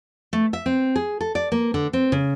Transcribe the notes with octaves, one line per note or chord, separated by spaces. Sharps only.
A3
E5
C4
G#4
A4
D5
A#3
D3
C4
C#3